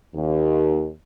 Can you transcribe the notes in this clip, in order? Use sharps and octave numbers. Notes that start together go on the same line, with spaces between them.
D#2